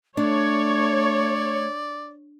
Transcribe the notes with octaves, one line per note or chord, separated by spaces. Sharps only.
A3 D4 C#5 D5